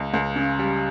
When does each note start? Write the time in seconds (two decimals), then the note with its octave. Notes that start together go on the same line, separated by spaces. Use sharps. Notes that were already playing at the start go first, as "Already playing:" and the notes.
Already playing: C#2
0.14 C#2
0.36 C#3
0.59 G3